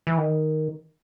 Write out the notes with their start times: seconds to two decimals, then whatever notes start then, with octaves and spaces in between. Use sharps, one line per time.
0.07 E3
0.18 D#3